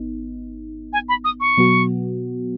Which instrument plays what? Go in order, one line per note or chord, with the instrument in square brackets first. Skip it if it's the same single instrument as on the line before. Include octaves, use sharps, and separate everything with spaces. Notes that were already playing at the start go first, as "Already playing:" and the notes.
Already playing: [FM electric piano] G#1 B3 D#4
[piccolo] G#5
B5
D#6
C#6
[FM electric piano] B2 F#3 B3 F#4